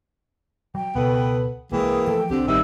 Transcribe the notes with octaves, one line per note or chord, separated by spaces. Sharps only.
F#3 G5
C#2 B2 B3 A4 B4
C2 E3 G#3 A#3 G#4 G5
F3 A3 A4
C2 D3 C4 G4
A1 D#3 G3 E5 E6